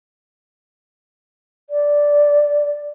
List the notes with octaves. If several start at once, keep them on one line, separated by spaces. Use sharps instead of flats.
D5